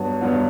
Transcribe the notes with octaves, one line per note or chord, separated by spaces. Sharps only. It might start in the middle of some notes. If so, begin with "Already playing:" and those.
Already playing: G2 F#3 B3
G2 F#3 B3